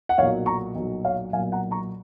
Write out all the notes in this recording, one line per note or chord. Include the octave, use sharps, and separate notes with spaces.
F#5
B1 A#2 F#3 C#5 F5
A#5 C#6
B1 A#2 F#3
C#5 F5
B1 A#2 F#3 F5 G#5
F#5 A#5
A#5 C#6